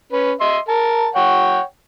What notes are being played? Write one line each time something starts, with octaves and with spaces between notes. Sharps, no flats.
C#4 B4
D#5 E5 C6
A#4 A5
C#5 F#5 G5